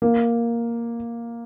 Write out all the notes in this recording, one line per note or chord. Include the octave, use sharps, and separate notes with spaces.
A#3